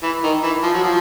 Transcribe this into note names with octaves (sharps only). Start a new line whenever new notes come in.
E3
D#3
E3
F3
F#3
F3